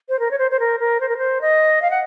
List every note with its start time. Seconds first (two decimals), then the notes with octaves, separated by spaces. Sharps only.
0.09 C5
0.19 A#4
0.31 C#5
0.39 C5
0.51 C5
0.60 A#4
0.80 A#4
1.00 C5
1.09 A#4
1.18 C5
1.41 D#5
1.82 F5
1.91 F#5